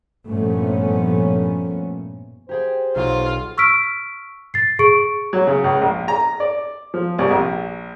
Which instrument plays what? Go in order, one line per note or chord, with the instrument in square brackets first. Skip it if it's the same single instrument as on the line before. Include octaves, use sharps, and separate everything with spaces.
[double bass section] G2 A#2 F3 A3 B3 C#4
[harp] G4 G#4 G5 [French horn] C5
[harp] B1 [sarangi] F4
[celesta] C#6 E6 F6 B6 D7
A6 C7
G#4 C#6 C#7 D7
[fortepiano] F#3
C#3
C#2
A#1
A#5
D5
F3
C2
A#1